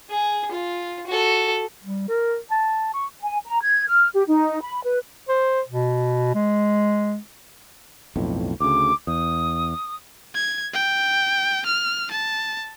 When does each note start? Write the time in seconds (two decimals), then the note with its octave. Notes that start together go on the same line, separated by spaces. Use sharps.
0.10 G#4
0.51 F4
1.07 F#4 A4
1.84 G3
2.08 A#4
2.51 A5
2.94 C#6
3.22 G#5
3.45 A#5
3.62 G#6
3.88 F6
4.14 G4
4.27 D#4
4.63 B5
4.84 B4
5.29 C5
5.69 B2
6.35 G#3
8.16 B1 F2 A2
8.60 D2 C#3 D6
9.07 E2 D#6
10.35 G#6
10.74 G5
11.66 F6
12.11 A5